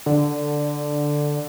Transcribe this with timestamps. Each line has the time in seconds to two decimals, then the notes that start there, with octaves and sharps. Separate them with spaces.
0.06 D3